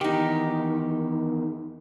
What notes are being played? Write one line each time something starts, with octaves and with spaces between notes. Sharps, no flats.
E2 D#3 D#4 G4